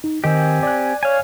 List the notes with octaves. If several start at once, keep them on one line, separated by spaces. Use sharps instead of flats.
D#4
D#3 C4 G4 A#4 D#5 G#5
D5 F#6
C#5 F5 G#5